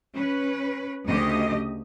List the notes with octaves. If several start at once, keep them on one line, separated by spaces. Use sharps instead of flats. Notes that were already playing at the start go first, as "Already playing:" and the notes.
C#4 B4
D2 C#3 G4 D#5